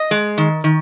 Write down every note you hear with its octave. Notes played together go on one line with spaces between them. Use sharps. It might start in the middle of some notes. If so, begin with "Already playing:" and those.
Already playing: D#5
G#3
D#3
D#3